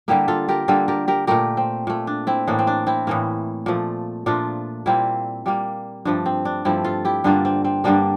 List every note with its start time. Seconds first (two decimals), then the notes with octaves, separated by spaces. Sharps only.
0.08 D3 G3 A#3 E4 G4
0.28 F4 A4
0.48 G4 A#4
0.68 D3 G3 A#3 F4 A4
0.88 G4 A#4
1.08 G4 A#4
1.27 A#2 A3 G4 A#4
1.57 C4
1.87 A#2 A3
2.07 D4
2.27 C4 E4
2.47 A2 E3 A#3 D4
2.59 C4
2.67 D4
2.87 C4 E4
3.07 A2 E3 A#3
3.66 A#2 F3 A3
4.26 A#2 F3 A3 D4 F4
4.86 A#2 G3 A#3 C4 E4
5.46 A#2 G3 A#3
6.05 G2 F3 A3 D4
6.26 C4
6.45 D4
6.65 G2 F3 A3 C4 E4
6.85 F4 A4
7.05 E4 G4
7.24 G2 D3 G3 A#3 D4 F4
7.45 C4
7.64 C4
7.84 G2 D3 G3 A#3 D4